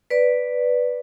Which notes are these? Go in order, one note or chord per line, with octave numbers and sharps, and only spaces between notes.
B4 D5